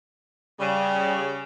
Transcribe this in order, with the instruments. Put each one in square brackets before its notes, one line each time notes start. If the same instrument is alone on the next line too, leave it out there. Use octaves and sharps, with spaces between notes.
[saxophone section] C#3 [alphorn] G3